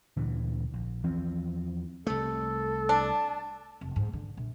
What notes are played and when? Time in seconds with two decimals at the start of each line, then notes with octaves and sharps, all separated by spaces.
0.17 D2 A#2 D3 E3
0.74 A#1
1.04 E2 E3 F3 C4
2.07 C2 A3 A4
2.89 D4 A5
3.81 F1
3.96 G#2
4.13 D3
4.37 A#1